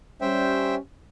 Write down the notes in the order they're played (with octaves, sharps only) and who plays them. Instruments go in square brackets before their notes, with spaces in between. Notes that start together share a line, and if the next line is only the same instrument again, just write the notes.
[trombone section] G3 C#4 [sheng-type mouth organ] C5 E5 G5